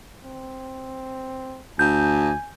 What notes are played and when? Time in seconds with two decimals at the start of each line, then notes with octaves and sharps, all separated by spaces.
0.25 C4
1.79 D2 G#5 G6